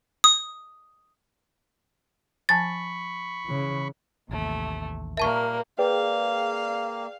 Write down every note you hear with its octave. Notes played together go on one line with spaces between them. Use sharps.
D#6
F3 G#5 A5 B5 C#6 A6
C#3 E3
A1 D#2 C3 A3
A#2 G3 A#3 A#4 E5 A5 C#6
A#3 G#4 B4 D5 F5 G5